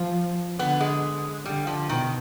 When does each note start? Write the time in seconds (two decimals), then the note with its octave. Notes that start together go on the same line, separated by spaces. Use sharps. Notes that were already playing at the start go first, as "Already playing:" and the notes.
Already playing: F3 F4
0.59 D3 B3
0.81 G#3
1.45 D3 G3
1.67 F3
1.89 B2 D#3